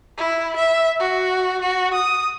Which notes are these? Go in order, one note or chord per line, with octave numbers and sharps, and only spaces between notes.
E4
E5
F#4
F#4
D#6